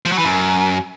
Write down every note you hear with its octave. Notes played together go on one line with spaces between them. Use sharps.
F3
F#3
E3
F#2